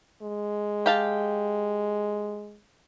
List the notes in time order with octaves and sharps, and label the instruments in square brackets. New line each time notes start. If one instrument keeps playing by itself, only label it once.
[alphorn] G#3
[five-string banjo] G4 F5 A5